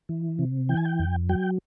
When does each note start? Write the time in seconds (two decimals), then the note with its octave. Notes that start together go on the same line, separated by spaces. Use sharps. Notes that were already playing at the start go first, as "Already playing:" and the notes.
0.09 E3
0.39 C3
0.69 E3 G5
0.77 G#5
0.85 G5
0.99 F2
1.29 F#3 G5